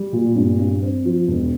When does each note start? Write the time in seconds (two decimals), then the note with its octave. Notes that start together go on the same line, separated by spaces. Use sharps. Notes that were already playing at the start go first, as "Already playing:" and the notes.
Already playing: G3
0.13 A#2
0.36 G2
0.59 G2
0.82 C4
1.05 F3
1.28 E1